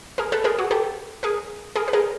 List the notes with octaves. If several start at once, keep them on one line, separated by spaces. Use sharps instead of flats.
G#4 A#4
A4 B4
G#4 A#4
F#4 G#4
G4 A4
G#4 A#4
G#4 A#4
B4
G#4 A#4